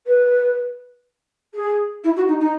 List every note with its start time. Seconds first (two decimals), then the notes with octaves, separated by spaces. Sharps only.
0.06 B4
1.54 G#4
2.04 E4
2.16 F#4
2.27 D#4
2.40 D#4